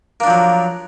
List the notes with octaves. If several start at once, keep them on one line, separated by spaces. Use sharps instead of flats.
F3 F#3 A#3 D4